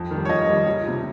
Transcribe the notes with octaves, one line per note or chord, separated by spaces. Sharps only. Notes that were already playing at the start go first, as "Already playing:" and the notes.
Already playing: F2
D#3 G3
C#5
F2 D#5
D#3 G3
C#2
C3 F3